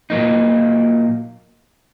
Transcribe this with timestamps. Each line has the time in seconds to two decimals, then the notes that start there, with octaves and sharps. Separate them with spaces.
0.10 A#2 F#3 A#3 D#4